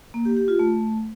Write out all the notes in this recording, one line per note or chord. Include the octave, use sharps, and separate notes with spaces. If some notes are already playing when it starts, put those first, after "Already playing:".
A#3
G4
G4
F4
A3